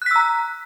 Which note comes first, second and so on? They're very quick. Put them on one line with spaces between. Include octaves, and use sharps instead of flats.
F#6 B6 E6 A#5